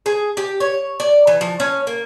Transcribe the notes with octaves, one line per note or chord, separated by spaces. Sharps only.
G#4
G4
C#5
D5
E3
F3
C#4
A#3